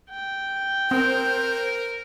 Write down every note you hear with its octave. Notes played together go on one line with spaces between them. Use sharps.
G5
C4 A#4 C5